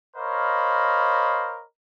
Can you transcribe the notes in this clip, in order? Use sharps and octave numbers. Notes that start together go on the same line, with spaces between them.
A#4 C5 C#5 D#5 F5 B5